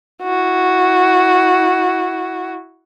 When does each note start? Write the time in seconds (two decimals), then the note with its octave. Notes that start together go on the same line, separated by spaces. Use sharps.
0.22 E4 F#4